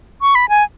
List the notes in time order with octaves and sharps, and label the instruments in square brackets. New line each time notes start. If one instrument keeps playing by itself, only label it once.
[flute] C#6
B5
G#5